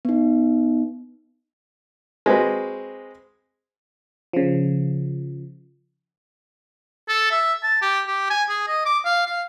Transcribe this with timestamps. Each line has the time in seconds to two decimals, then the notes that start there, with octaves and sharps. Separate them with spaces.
0.05 B3 D#4
2.26 G#3 C4 F#4 B4
4.33 C#3 F3
7.09 A4
7.31 E5
7.63 A5
7.82 G4
8.07 G4
8.30 G#5
8.49 G#4
8.68 D#5
8.86 D6
9.05 F5
9.27 F5